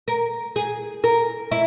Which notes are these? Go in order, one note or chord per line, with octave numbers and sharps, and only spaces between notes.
A#4
G#4
A#4
E4